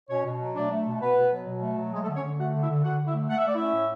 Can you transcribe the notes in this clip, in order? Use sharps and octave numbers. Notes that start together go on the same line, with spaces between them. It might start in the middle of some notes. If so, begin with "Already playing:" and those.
B2 C#4 C#5
B2
F#3
A3 D4 D5
A3
B2
B2 B3 B4
B2
F#3
B2
A3
F#3
G#3 A3 G#4
A3 A4
D3
C#4 C#5
D3
A3 F#4 F#5
D3
E4 E5
D3
D3 F#4 F#5
D3
E4 E5
A3
A3 F#5
E5
A3 D5
C#4 E4 E5
A2